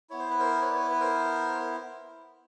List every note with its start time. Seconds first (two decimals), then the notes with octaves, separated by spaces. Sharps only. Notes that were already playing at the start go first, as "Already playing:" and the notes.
0.10 B3 E4 C#5
0.19 C5
0.30 B4
0.39 A#4 C5
0.61 B4 C#5
0.70 D5
0.75 B4 C#5
0.90 B4
1.00 A#4 C5